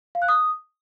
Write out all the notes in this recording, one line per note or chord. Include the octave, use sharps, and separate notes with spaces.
F5
F#6
D#6